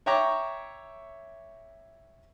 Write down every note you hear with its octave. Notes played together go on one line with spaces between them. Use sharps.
C#5 E5 G5 A#5 C#6 D6